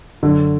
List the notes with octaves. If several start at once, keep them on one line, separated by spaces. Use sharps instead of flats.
G1 F#2 D3 F#3